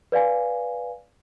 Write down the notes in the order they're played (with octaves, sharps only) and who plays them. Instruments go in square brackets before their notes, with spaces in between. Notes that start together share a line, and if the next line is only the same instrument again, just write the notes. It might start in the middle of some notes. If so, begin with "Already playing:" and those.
[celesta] B4 D5 F5 G#5